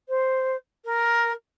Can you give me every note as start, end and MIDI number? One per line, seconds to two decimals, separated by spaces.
0.09 0.56 72
0.85 1.32 70